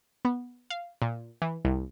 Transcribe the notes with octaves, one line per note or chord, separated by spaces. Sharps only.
B3
F5
A#2
E3
C2